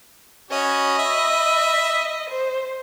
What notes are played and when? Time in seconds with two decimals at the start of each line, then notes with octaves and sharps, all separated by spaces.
0.51 C#4 F#4 D#5 B5
0.99 E5
2.30 C5